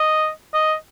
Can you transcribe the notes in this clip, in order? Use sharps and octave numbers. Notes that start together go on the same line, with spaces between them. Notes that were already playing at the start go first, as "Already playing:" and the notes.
Already playing: D#5
D#5